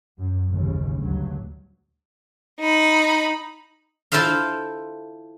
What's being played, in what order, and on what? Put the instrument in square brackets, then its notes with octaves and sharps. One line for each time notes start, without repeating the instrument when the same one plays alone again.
[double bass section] F#2
A1 D#2 C#3
D2 G2 F#3
[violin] D#4 B5
[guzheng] E4 F4 A4 C5 E5 F5